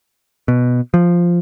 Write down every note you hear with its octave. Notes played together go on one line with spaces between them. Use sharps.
B2
F3